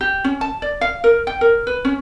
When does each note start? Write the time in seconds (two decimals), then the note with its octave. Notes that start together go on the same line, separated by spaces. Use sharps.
0.01 G4
0.24 C#4
0.41 A5
0.62 D5
0.81 F5
1.04 A#4
1.27 G5
1.41 A#4
1.67 B4
1.85 C#4